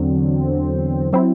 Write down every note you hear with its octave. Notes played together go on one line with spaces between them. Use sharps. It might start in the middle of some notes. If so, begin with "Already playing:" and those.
Already playing: E2 D3 F#3 C4
F#3 C4 E4